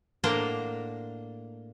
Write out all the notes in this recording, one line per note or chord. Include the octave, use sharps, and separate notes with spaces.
A2 A#3 D4 C5 F#5 A#5